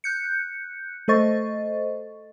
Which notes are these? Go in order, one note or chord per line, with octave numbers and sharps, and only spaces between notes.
F#6 G6 C#7
A3 A4 C5 D#5 C#6 A6